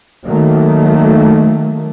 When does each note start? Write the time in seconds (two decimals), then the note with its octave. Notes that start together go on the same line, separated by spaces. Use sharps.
0.25 D#3 F#3 A3 A#3